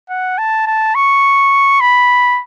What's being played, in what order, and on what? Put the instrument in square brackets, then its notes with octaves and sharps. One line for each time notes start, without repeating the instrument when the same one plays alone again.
[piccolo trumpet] F#5
A5
A5
C#6
B5